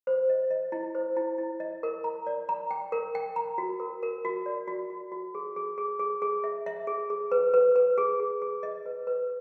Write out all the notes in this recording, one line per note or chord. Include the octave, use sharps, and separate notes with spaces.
C5
D#5
D#5
E4
C5
E4
E4
D#5
A#4
A#5
D5
A#5
G5
A#4
G5
A#5
F#4
A#4
A#4
F#4
D5
F#4
F#4
F#4
G#4
G#4
G#4
G#4
G#4
E5
E5
G#4
G#4
B4
B4
B4
G#4
G#4
G#4
D#5
B4
B4